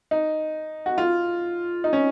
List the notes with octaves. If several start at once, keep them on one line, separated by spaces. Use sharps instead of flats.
D#4
F#4
F4
D#4
C#4